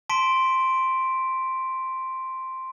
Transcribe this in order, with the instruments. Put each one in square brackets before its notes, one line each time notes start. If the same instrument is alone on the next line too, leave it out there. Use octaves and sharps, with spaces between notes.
[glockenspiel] A5 C6 B6 D7